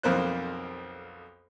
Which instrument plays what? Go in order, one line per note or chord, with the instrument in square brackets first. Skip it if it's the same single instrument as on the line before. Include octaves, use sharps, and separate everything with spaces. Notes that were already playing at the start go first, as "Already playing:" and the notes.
[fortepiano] B1 F2 A#3 C5 F#6